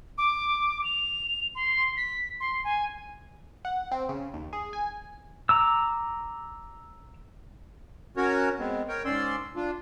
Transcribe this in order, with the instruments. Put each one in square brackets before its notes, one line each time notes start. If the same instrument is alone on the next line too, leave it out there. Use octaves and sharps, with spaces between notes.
[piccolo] D6
F7
C6
B6
C6
G#5
[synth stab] F#5
C4
C#3
D#2
G#4
G#5
[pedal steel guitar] A#5 D6 E6
[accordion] C#4 F#4 A#4 C#5
G#3 B3 C4
A#4 C#5 G5
G#2 C#4 D5 C6 E6
D4 F4